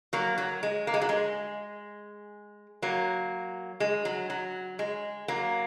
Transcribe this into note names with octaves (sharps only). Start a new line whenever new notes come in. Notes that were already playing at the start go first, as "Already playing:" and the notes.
F#3 A#3
F#3
G#3
A#3
G#3
F#3
G#3
F#3 A#3
G#3
F#3
F#3
G#3
F#3 A#3